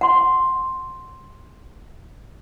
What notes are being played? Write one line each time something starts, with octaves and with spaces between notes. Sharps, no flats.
F#5 C6